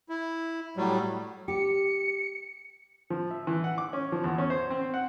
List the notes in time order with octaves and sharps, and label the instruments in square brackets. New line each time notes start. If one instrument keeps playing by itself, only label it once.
[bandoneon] E4
A2 F#3 G3
[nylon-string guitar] G4 [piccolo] C#7
[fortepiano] F3
E5
E3
F#5
D6
C#4
F3
E2
C#4
C5
C4
F#5